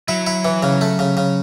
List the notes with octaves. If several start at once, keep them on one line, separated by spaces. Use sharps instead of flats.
F#3 E4
E4
E3
C#3
A3
C#3
C#3